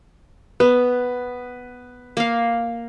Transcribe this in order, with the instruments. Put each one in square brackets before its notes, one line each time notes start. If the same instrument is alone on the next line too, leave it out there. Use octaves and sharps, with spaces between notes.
[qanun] B3 [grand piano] B4
[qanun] A#3 F5